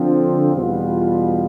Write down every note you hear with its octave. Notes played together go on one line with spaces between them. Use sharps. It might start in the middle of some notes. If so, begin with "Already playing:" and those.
Already playing: D3 F3 C4
E2 B2 G3 B3 F4